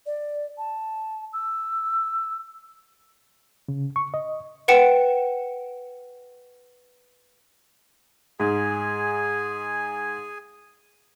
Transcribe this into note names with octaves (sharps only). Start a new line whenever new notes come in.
D5
A5
E6
C#3
C#6
D#5
B4 F#5 G5 C#7 E7
G#2 G#4 G#5